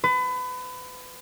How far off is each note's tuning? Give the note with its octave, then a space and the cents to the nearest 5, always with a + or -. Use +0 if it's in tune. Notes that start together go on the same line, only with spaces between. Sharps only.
B4 +30